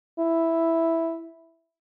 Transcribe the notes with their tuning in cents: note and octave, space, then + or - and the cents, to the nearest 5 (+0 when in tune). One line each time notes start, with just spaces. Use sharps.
E4 +0